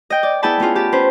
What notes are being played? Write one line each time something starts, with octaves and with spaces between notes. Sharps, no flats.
D#5 G5
D5
B3 E4 G#4 G5 A5 B5
B3 C#4 F4 G#4
G4 A5
C#4 B4 C5